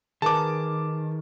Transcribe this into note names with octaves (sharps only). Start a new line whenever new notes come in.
D#3 G#4 A#4 B4 A5 D6